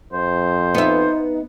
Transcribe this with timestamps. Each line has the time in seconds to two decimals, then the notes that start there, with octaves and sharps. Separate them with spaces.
0.13 F2 C5
0.74 B3 D#4 E5